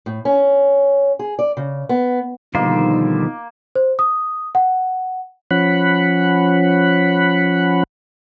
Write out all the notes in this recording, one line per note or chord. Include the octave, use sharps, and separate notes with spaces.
A2
C#4
G#4
D5
C#3
B3
B2 D3 D#3 F3 G3 A#3 D#4 C5
C5
D#6
F#5
F3 C#4 F#5 B5